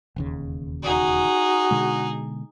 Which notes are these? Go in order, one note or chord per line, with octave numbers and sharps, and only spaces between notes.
E1 D#2 C#3
D#4 F#4 G#4
B2 D3 G#3